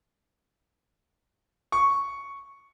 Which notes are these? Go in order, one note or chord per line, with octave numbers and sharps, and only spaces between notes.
C#6